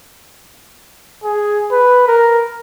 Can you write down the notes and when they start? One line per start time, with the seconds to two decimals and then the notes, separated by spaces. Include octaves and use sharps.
1.24 G#4
1.72 B4
2.08 A#4